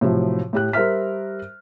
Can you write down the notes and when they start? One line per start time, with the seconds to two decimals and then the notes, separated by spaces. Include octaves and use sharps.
0.01 A2 C3 F3 F#3
0.53 A2 G4 F#6
0.73 G3 A#4 C5 E5 F6 B6